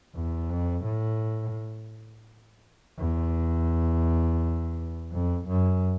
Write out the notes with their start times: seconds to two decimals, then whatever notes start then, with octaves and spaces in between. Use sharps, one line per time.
0.15 E2
0.50 F2
0.86 A2
2.99 E2
5.12 F2
5.48 F#2